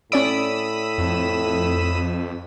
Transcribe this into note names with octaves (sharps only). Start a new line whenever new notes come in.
A2 C#4 D5 B5 D#6 E6 D7
F2